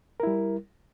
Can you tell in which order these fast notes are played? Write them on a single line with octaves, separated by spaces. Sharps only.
A#4 E4 G3